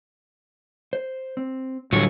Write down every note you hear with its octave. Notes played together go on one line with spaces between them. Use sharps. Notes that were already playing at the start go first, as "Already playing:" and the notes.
C5
C4
A2 D3 F#3 G3 F4 C#5